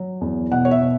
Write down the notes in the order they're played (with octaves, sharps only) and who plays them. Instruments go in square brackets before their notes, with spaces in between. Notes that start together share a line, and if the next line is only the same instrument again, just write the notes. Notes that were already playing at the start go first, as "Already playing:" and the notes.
Already playing: [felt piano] F#3
E2
B2 F#5
C#5
E5
B2